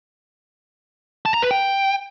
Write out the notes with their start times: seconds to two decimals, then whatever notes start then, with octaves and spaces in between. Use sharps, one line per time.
1.26 A5
1.34 A#5
1.42 B4
1.51 G5